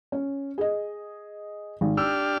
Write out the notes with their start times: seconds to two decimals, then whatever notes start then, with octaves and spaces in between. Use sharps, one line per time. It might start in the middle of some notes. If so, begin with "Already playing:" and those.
0.12 C#4
0.58 G#4 D#5
1.81 G#1
1.97 D4 G4 E6 F6